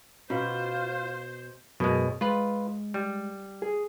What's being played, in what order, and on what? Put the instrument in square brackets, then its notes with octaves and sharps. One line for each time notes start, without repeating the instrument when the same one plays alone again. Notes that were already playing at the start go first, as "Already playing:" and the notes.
[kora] B2 [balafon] C#4 [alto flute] F4 [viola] C5
[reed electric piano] F#2 [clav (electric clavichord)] B2 G#3
[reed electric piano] G#3 [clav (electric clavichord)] F4 B4
[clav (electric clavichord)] G3
[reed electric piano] G#4